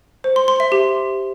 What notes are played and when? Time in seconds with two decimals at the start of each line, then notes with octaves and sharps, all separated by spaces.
0.24 C5
0.36 C6
0.48 C6
0.60 E5
0.72 G4